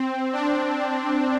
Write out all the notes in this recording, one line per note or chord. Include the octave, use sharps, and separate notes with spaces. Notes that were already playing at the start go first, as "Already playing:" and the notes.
Already playing: C4
D4